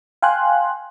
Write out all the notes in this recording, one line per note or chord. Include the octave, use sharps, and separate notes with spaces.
F5 G5 G#5 C6 F#6